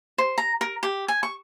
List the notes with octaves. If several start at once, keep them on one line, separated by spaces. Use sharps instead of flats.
C5
A#5
A#4
G4
G#5
C#6